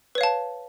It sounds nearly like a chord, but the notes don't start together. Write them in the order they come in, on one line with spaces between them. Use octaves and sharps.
B4 C#5 F5 A5